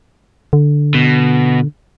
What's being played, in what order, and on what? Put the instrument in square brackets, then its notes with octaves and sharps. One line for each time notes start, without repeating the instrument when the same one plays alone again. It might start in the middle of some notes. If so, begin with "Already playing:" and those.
[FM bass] D3
[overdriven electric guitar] B2